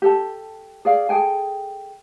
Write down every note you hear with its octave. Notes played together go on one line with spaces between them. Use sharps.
G4 A4 A5
G#4 D5 F5
G#4 A4 G5 G#5